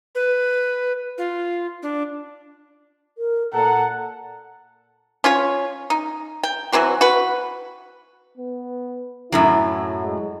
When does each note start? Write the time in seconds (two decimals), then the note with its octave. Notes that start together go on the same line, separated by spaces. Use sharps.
0.15 B4
1.18 F4
1.82 D4
3.18 A#4
3.53 A#2 A4 F#5 A#5
5.24 C#4 F4 C#5
5.90 D#4
6.43 G5
6.72 E3 F#3 C4 F#4
7.01 F#4 B4
8.38 B3
9.32 F#2 A2 F#3 E4
10.04 G#3